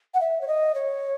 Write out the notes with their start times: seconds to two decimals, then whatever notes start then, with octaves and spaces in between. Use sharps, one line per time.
0.14 F#5
0.20 E5
0.41 C#5
0.47 D#5
0.74 C#5